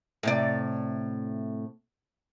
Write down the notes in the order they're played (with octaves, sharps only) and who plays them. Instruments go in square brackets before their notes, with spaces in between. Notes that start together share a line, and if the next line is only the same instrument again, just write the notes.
[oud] A2 C3 D5